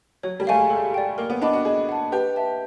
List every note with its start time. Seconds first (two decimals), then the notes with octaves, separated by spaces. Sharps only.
0.23 F#3 C#5
0.40 G3
0.47 A3 F5 G#5
0.54 G#3
0.70 G#3 A4
0.94 D5 G5
1.18 A#3 A#4
1.30 B3
1.42 D4 D#5 F#5 B5 D6
1.53 F#4
1.65 G#4 D#5
1.89 F#5 A5
2.12 G4 B4
2.36 E5 A5